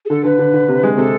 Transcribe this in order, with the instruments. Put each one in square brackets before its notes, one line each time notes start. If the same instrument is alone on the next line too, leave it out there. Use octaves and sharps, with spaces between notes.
[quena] G#4
[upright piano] D3 [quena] A4
[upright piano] D3 [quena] B4
[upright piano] D3
D3
C3
G#3
[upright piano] C3 [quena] A4